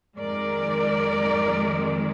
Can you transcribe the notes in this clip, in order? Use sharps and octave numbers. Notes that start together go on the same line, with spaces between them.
F2 D#3 G#3 A#4 D5